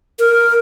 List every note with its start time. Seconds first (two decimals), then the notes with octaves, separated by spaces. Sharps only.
0.19 A#4